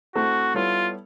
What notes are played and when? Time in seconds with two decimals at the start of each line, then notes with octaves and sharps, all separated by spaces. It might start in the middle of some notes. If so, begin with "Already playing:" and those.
0.15 A3 C4 E4 F#4 A4
0.54 G3 B3 E4 F4 A4 C#5